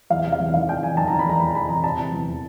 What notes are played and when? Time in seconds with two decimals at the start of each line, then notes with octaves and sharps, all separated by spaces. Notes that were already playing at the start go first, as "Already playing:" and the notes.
0.10 E2 F5
0.25 C3
0.32 F5
0.40 E2
0.54 D#3 F5
0.68 D#3 G5
0.83 E2 G#5
0.97 D#3 A5
1.08 A#5
1.12 E2
1.19 B5
1.26 E2 A#5
1.40 E2 B5
1.55 C3 B5
1.69 E2 A#5
1.83 C3 A5
1.99 E3
2.12 E2